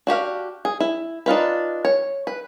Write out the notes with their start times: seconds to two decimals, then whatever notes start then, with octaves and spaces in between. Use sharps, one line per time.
0.07 D4 F#4 G4 F5
0.65 G#4
0.80 E4
1.26 D4 D#4 F4 B4
1.85 C#5
2.27 B4